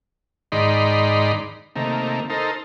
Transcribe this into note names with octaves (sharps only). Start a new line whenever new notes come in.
G#2 D#3 D#4 D5 B5 C6
C3 D#3 A3 A#3
D#4 A4 A#4 C5